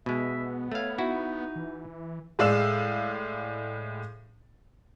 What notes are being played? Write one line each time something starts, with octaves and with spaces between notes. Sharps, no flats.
B2 G#3 B3 E5
A3 C#5 F5
D#4 E4 F#4
E3
A2 G#3 D5 F5 E6 E7